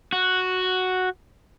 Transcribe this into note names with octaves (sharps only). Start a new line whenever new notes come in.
F#4